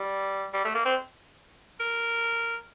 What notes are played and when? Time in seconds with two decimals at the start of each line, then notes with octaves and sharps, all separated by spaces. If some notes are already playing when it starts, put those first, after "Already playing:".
Already playing: G3
0.53 G3
0.64 A3
0.75 A#3
0.85 C4
1.80 A#4